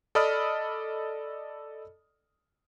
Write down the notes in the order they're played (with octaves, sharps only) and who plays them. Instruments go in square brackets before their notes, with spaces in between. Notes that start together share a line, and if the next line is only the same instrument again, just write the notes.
[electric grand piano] A4 D5 D#5 B5 D#6 F6